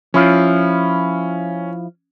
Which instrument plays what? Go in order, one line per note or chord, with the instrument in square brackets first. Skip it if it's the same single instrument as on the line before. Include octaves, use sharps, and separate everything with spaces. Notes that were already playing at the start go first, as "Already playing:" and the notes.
[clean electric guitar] F3 E4 F4 [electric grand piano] C#4